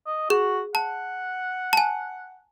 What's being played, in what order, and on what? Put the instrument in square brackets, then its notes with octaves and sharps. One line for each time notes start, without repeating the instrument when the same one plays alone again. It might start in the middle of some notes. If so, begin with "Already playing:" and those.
[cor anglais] D#5
[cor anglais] F#4 [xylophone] G#4
[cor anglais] F#5 [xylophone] A5
[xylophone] G#5 A5